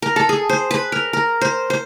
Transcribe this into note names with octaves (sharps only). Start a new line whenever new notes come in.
A#4
A4
G#4
C5
B4
A#4
A#4
C5
C5